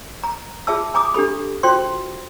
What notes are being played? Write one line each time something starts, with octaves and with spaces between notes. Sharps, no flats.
A#5
F4 G#4 E5 A5 E6
G#5 A#5 D6 D#6
D4 G4 A4 B5
F4 F#4 C5 G5 C6